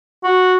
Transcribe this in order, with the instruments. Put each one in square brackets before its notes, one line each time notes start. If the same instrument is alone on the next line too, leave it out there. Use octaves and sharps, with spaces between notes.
[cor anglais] F#4